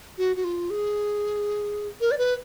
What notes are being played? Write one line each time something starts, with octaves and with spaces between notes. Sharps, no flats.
F#4
F#4
F4
G#4
A#4
D5
B4